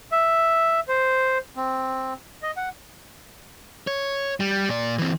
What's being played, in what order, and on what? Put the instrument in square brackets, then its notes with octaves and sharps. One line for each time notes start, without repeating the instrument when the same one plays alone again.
[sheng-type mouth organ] E5
C5
C4
D#5
F#5
[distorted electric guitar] C#5
G3
A#2 D5
E3 C4